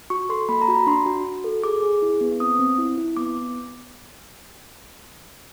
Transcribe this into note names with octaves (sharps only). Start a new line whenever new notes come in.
F#4 C#6
A4 C6
A#3 B5
A#5
F#4 B5
A#5
D4 C6
F#4
F#4
A4
G#4 D6
G#4
E4
B3
C4 D#6
C4
E4
E4
B3 D6